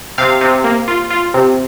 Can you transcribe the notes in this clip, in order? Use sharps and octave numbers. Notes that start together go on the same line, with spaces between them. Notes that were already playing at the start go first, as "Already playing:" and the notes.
C3 F5
C3
A#3
F4
F4
C3